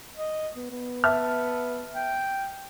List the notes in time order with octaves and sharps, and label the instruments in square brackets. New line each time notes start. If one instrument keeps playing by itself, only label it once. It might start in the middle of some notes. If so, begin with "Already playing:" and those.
[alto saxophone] D#5
B3
B3
[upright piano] E5 A5 F6
[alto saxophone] G5